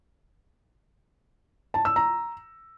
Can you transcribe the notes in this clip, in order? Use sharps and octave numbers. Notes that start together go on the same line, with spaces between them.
A5
E6
A#5